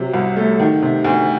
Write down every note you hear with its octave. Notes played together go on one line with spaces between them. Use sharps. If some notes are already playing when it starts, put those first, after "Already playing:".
Already playing: C3 F#3
C2
A3
D#3
C3
D2